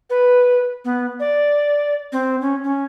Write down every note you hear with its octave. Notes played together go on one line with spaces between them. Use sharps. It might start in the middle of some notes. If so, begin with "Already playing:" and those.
B4
B3
D5
C4
C#4
C#4